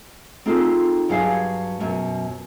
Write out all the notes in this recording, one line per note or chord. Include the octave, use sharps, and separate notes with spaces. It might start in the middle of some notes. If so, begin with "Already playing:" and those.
C4 D#4 F4 G#4 A4
G2 F#3 G3 G#4 F5
F#2 B2